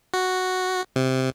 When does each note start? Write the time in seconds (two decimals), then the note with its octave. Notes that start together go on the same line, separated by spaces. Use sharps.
0.14 F#4
0.96 C3